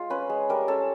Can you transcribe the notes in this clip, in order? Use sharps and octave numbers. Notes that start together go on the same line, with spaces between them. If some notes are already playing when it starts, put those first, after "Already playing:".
Already playing: G#3 F4
C#4 B4
G#3
G3 A#4
C#4 A4